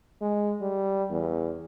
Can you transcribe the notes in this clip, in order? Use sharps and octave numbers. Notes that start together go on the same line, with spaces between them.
G#3
G3
E2